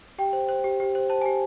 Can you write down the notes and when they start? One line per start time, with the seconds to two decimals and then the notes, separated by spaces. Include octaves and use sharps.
0.18 G4 G5
0.33 C5
0.49 C5
0.64 G4
0.80 G4
0.95 C5
1.10 C5 A5
1.22 G#5
1.26 G4